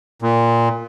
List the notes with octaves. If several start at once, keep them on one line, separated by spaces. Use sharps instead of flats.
A#2